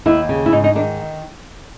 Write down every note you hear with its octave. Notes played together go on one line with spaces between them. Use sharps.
D#2 E4
C#3
E4
G#2 D#4
D#4
D#3 D4